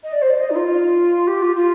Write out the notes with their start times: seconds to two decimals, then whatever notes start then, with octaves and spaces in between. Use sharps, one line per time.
0.04 D#5
0.13 D5
0.22 C5
0.31 D5
0.41 D#5
0.50 D#4
0.56 F4
1.27 G4
1.42 F4
1.56 F4